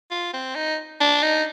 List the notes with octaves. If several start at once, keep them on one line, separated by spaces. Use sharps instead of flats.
F4
C4
D#4
D4
D#4